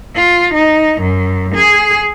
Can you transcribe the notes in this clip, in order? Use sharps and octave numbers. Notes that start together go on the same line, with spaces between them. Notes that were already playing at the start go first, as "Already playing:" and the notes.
F4
D#4
F#2
G#4